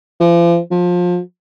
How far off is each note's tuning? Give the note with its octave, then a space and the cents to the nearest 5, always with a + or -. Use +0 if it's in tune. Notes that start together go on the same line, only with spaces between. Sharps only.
F3 -40
F3 +25